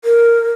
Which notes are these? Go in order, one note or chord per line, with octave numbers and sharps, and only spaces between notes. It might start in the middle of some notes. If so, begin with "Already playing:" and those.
A#4